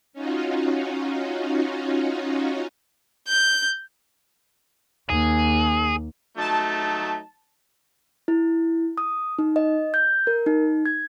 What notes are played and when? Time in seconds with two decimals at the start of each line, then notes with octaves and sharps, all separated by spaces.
0.13 C#4 D#4 F4 F#4
3.28 G6
5.10 D#2 G#4
6.37 F#3 A3 D#4 A5
8.28 E4
8.98 D#6
9.39 D#4
9.56 D#5
9.94 G6
10.27 A#4
10.46 D#4
10.86 G#6